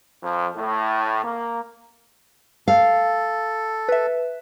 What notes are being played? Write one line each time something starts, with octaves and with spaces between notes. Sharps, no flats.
F2
A2
A#3
A4 F5
B4 E5